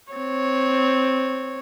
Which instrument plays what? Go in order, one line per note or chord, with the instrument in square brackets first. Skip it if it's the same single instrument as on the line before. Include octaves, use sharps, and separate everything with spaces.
[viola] C4 C#5